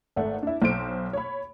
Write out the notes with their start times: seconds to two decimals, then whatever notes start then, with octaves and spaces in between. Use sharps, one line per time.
0.16 G#1 A3 F#5
0.43 D4 E4
0.62 B1 C5 D7
1.13 C#5 B5